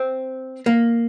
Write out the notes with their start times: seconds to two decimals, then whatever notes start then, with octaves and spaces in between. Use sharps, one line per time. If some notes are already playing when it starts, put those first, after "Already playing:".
Already playing: C4
0.66 A#3